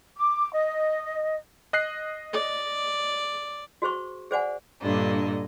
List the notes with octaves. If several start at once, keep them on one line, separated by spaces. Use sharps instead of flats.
D6
D#5
D#5 F#6 C7
D5
F#4 G#4 C5 C#6
G#4 C5 D5 F#5 G#5
G2 A#2 D3 D4 D#5